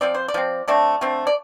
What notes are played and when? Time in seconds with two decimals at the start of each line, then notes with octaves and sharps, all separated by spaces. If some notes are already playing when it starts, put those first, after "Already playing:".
0.01 F3 C4 D5
0.14 C5
0.28 D5
0.34 F3 C4
0.68 D3 A3 C4 D5
1.01 D3 A3 C4
1.27 D5